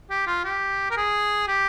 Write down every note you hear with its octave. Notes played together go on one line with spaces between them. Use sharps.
G4
F4
G4
A#4
G#4
G4